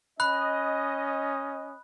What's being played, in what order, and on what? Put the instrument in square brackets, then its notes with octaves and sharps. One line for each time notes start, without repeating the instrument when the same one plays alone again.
[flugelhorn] C#4 [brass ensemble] D#5 [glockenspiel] B5 F#6